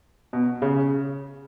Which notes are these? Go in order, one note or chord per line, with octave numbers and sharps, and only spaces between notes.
B2
C#3